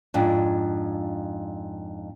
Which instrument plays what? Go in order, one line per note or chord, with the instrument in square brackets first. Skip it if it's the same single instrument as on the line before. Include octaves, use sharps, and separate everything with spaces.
[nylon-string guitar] F2 G#2 D4